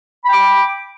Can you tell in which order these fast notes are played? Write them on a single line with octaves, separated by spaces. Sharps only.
B5 G5 D6